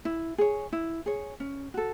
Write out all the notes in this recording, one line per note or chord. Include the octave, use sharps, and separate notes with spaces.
E4
G#4 C#5
E4
G#4 C#5
C#4
F#4 A4